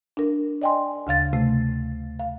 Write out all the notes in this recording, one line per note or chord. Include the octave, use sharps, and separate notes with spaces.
D4 A#4
D5 D#5 G5 G#5 C6
D2 C#3 F5 A6
C3 A3
F5